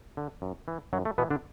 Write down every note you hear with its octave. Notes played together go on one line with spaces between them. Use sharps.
D3
F#2
E3
F#2 F#3
A3
B2 E3 B3
D3 D4